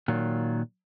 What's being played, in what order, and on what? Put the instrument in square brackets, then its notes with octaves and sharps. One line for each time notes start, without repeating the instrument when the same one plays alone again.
[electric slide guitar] A#2 D#3 F#3 F4